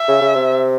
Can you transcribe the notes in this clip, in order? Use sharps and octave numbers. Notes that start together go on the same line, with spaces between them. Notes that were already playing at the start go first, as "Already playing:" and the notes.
Already playing: E5
C#3
C#3
C3